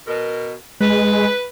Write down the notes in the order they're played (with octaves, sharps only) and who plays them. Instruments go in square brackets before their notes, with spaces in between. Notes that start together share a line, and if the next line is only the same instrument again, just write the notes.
[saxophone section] B2 A#4
[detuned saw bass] G#3 [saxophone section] B4